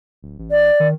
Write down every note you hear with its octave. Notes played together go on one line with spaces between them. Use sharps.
D1
A1
D5
D#3